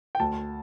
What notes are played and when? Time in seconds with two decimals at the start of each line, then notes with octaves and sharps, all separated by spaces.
0.15 G5
0.20 D2 A5